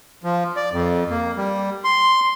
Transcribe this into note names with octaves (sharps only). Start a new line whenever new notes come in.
F3
D5
F2
A#3
G3
C6